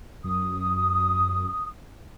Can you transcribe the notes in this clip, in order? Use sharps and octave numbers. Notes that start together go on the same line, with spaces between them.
F#2 D#6